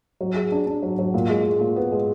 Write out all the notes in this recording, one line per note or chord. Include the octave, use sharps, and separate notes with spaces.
F#3
G#4
D4
D4
F#3
F#3
A#2
G#3
G#3
A#2
B3
G#3